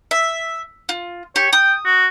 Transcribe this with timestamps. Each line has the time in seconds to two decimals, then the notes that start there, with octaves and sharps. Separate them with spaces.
0.11 E5
0.89 F4
1.36 G4 C#5
1.53 G5 D#6
1.85 F#4